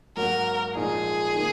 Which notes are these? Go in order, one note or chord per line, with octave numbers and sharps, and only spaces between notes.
G#2 F#3 A#3 F#4 A#4
A#1 A#2 G#3 D#4 G#4
D#3 A#3